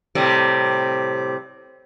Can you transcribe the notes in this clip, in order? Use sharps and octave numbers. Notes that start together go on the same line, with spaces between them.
A2 C3 G3